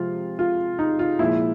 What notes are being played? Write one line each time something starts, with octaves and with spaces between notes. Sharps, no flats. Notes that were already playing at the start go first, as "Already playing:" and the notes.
Already playing: C3 F3 G#3 F4
F4
D#4
F4
A#2 F3 G#3 E4